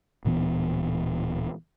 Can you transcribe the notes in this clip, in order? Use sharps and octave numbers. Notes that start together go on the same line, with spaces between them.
D1 A#2 E3 B3